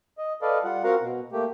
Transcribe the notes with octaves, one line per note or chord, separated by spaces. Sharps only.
D#5
A4 B4 D5 D#5 F5
G3 F4 F#5
C4 F#4 A#4 F5 F#5 A#5
B2
A3 A#3 G4